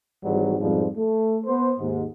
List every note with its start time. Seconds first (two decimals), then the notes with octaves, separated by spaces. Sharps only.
0.24 G#1 G#2 E3 F#3 G3
0.60 F2 G#2 B2 F3 G3
0.97 A3
1.46 B3 C5
1.79 D#2 G#2